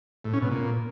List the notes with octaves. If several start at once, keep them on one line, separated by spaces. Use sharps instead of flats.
A2
C#4
B2
A#2